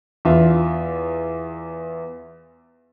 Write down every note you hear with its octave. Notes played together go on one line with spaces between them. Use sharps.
E2 F4 E5